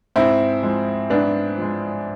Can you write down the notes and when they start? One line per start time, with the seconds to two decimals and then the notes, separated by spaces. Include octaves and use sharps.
0.16 G#2 C4 E4
0.62 F3 G#3
1.10 G#2 B3 D4
1.58 F3 G#3